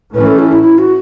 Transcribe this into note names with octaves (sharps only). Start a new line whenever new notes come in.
A2 E3 A3 C#4 B4
A4
E4
E4
E4
F#4